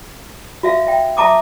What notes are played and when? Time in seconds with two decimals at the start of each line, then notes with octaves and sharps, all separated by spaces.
0.63 F#4 E5 F5
0.87 E5 G5
1.17 E5 A5 A#5 D6 D#6